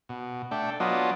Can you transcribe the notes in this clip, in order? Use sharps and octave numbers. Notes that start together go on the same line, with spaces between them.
B2
A3 D4 G5
F#3 B3 D4 F4 D#5